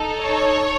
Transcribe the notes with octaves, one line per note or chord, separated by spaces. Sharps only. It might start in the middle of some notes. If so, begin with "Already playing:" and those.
Already playing: D#4 A4
C#5